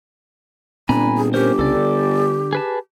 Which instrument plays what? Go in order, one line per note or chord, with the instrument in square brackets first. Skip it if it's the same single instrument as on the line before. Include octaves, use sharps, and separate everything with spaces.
[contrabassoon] G1 [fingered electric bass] A#2 C4 [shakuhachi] D4 [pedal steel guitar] G#5 A#5 B5
[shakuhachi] G#4
[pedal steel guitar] C#4 A#4 C5 [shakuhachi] G4
[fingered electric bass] C2 C#3 [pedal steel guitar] A4 D5
[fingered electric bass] D3
[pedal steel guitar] G#4 B4 A5